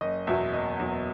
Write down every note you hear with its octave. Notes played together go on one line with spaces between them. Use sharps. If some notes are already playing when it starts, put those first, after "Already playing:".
F#1 D#5
E2 B2 F#3 E5
F#1 D#5
E2 B2 F#3